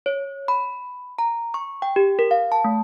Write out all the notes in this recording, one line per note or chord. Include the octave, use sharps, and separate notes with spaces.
C#5
B5
A#5
C#6
G5
G4
A#4
F5
A5
A3